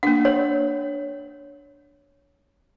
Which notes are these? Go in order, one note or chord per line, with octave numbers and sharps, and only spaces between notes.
A#3 D4 F#5
C#5